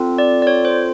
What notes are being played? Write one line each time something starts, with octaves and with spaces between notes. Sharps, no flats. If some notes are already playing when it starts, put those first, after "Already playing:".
Already playing: C4 F4 A4
D5
D5
C#5
C5